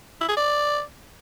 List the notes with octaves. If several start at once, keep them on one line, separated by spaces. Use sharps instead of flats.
E4
G#4
D5